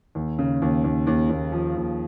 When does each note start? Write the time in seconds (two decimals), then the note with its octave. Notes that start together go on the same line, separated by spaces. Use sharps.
0.15 D#2
0.38 C#3
0.62 D#2
0.84 D#2
1.07 D#2
1.30 D#2
1.52 F3
1.76 D#2